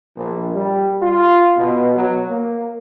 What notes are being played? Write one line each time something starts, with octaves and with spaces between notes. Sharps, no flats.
A#1
G3
F4
B2
F#3
A#3